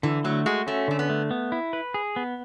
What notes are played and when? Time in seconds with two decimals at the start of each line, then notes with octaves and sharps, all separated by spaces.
0.03 D3 E3
0.24 F#3 A3
0.46 G#3 F#4
0.67 A3 C#4
0.88 D3 A3
0.99 B3
1.10 A3
1.31 B3
1.52 E4
1.73 B4
1.94 G#4
2.16 B3